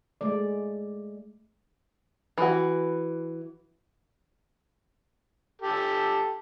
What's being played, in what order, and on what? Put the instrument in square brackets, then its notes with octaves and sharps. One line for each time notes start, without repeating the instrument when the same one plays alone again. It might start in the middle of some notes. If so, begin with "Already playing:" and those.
[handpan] G#3 A3 D5
[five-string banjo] E3 F#4
[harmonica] G4 A4